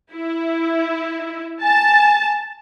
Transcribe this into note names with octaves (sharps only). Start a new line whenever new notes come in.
E4
G#5 A5